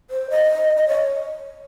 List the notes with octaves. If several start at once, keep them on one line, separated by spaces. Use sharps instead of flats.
C5
D#5
D#5
C#5